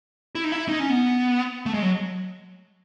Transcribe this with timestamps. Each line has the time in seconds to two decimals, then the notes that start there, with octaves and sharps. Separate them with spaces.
0.35 E4
0.44 D#4
0.52 E4
0.68 D#4
0.79 C#4
0.90 B3
1.66 A3
1.74 G#3
1.82 F#3